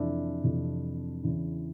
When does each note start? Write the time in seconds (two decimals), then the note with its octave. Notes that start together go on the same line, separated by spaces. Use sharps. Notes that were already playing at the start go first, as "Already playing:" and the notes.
Already playing: F2 C3 E3 D4 E4
0.44 F2 C3 E3
1.24 E2 C#3 E3